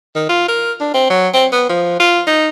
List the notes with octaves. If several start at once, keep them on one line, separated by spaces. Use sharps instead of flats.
D#3
F4
A#4
D4
C4
F#3
C4
B3
F3
F4
D#4